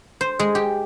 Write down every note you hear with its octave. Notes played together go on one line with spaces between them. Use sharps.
C5
G#3
G4